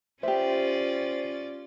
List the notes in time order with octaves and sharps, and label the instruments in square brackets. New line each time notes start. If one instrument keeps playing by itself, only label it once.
[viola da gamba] C#4 F4 D5 [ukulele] G4 B4 E5 [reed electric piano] C5